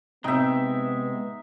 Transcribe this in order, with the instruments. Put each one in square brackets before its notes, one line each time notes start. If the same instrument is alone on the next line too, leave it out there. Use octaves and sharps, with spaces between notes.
[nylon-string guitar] C3 [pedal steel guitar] G#3 G5 G6 [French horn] B3 [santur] D#4 E5